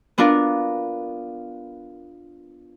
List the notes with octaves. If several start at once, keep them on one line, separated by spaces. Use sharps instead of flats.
B3 D4 F4 A#4